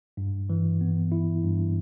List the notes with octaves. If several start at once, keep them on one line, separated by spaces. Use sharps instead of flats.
G2
E3
B3
E4
G2